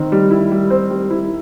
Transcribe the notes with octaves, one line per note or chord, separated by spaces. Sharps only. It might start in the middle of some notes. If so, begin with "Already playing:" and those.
Already playing: D#3 C4
G3
E4
G3
C4
G3
E4